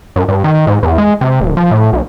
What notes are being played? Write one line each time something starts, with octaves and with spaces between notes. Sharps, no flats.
F#2
G2
D#3
G#2
E2
G#3
C3
D1
F3
A2
B1